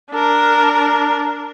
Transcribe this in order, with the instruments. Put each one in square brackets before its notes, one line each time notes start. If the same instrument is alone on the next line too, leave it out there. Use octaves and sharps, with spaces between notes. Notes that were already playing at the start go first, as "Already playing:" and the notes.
[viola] D4 A#4